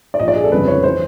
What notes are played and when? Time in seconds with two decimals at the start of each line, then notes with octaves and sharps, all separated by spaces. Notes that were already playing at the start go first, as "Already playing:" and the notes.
0.14 D5
0.19 A#1 A#2 D#5
0.28 D5
0.36 G#4
0.44 A4
0.52 G1 F2 C#3 B4
0.67 C#5
0.83 E3 C5